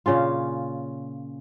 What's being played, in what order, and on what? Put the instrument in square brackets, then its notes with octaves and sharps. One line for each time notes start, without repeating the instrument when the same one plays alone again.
[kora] A#2 C#3 C#4 F4